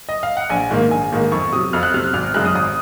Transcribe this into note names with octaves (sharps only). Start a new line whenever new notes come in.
D#5
F5
F#5
A#1 G#5
G#2 D#3 A#3
A#1 G#5
G#2 D#3 A#3
F2 C#6
C3 F#3 D#6
F2 F6
F#6
C3 F#3 F6
G#1 F6
F#2 C#3 G#3 F#6
D#6
G#1 D#6